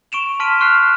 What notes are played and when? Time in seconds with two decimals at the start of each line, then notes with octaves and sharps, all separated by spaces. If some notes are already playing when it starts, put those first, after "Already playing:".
0.12 C#6 D7 E7 F7
0.39 A5 C6 F6 B6 D7 D#7
0.60 C#6 F6 F#6 C7 F7